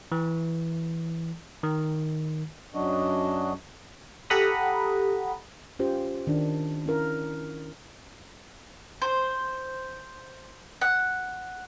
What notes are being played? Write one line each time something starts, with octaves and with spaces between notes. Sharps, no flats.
E3
D#3
F#2 F#3 D4 F#4 D#5
G4 A4 F#5 A#5 B5 D#6
C#4 F4 G4 C5
D#3 D4
C#4 E4 A#4
C5
F#5